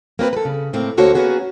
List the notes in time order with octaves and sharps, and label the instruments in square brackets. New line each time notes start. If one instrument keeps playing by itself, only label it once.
[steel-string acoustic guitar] A#3 C4 F4 B4
A4 B4
C#3
A2 A3 A#3 C4
D2 A#3 F#4 A4 C5 C#5
A#3 B3 C#4 F#4 G#4